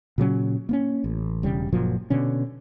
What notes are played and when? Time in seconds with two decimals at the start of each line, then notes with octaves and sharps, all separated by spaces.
0.18 A#2 C#3 F#3 C#4
0.69 A#3 B3 C#4
1.04 A1
1.43 E1 C#3 G3
1.72 F#1 A#2 F3 F#3
2.10 B2 D3 C#4